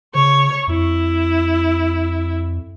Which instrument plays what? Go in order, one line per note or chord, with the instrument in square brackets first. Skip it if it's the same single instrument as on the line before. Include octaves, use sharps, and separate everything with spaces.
[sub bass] C#3 [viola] C#5 C#6
[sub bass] F2 [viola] E4